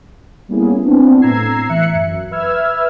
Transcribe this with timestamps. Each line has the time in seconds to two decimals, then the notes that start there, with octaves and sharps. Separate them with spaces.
0.49 G3 A#3 B3 C#4 E4 G#4
0.84 B3 C4 D4 E4
1.21 A2 A#5 E6 G#6 C7
1.69 E3 E5 F#6 C#7
1.94 F#2
2.31 B4 E5 E6 F6 G#6